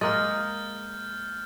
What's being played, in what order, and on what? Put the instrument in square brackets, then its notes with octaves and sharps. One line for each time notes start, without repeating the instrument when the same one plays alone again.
[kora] G#3 A#3 [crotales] F6 G6 A6